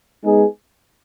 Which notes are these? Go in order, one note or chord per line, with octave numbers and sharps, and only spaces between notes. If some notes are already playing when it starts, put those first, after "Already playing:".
G#3 B3 D#4 G#4